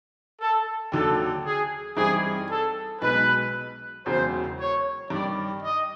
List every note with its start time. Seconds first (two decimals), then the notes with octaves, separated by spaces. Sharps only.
0.40 A4
0.92 D#2 D3 F#3 A4
1.44 G#4
1.97 G2 E3 G3 C4 D#4 G#4
2.49 A4
3.01 B1 B2 G#3 B4
4.06 E1 E2 C#3 F#3 C5
4.58 C#5
5.10 G2 D#3 G3 D5
5.63 D#5